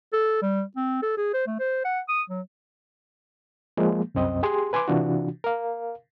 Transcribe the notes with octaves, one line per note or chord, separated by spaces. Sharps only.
A4
G3
C4
A4
G#4
C5
A3
C5
F#5
D#6
F#3
F3 G#3 A#3
C2 F#2 C4 D#5
G4 G#4 C6
B4 G#5 B5 C6 D6
C3 E3 D4 F4 F#4
A#4 F5